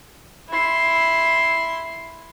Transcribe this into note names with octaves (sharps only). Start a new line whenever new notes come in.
E4 C6